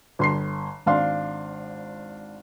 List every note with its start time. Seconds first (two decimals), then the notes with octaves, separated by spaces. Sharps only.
0.19 G1 C6 C7
0.86 G#1 D4 F5 C6